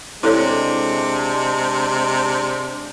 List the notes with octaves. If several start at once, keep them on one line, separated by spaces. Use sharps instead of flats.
C3 G#3 D4 E4 A4 C#5